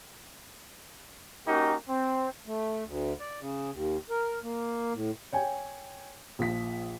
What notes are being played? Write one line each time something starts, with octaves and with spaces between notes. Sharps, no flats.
A#3 C#4 D#4 F#4 G4 A#4
C4
A3
D2
D5
C#3
D#2
A#4
A#3
A2
C#5 G5 G#5
A#1 F3 B6